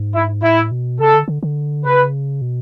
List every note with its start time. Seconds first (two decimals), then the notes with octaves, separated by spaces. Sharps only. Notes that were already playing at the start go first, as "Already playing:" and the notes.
Already playing: G#2
0.14 E4
0.43 A2 E4
0.71 B2
1.00 C#3 A4
1.14 D3
1.28 D3
1.43 D3
1.85 C#3 B4
2.42 B2